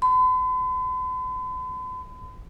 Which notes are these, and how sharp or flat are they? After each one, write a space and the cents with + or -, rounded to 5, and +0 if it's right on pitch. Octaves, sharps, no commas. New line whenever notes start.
B5 +45